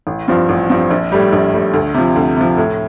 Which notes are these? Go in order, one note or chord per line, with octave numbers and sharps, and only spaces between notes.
A1
G2 F3 C4
A1
G2 F3 C4
A#1
A2 G3
A#1
A2 G3
D2
C3 F3
D2
C3 F3
A2